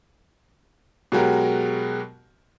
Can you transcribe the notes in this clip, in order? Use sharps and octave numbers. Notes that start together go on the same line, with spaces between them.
B2 F#3 G#3 F#4 G4 A#4